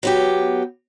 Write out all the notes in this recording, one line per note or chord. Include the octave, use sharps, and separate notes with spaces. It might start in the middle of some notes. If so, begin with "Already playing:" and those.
F#3 B3 G4